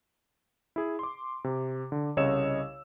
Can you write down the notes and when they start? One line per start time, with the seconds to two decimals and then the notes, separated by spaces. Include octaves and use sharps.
0.76 E4 G#4
0.99 C6 D6
1.44 C3
1.92 D3
2.17 C2 C#3 C#5 D#5 E6 E7